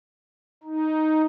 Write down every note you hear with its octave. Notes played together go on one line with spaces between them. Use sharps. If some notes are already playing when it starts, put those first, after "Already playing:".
D#4